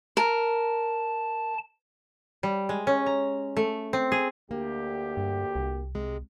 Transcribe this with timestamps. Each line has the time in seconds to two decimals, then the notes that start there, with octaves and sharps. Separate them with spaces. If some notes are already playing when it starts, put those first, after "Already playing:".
0.17 A#4 A5
2.43 G3
2.69 G#3
2.87 C#4
3.06 A#5
3.57 A3
3.93 C4
4.12 G#4
4.51 D2 A#3 G4
5.17 G2
5.56 C2
5.95 C3 G#3